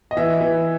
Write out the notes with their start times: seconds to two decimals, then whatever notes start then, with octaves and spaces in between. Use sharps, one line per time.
0.11 D#5
0.17 E3 E5
0.41 E3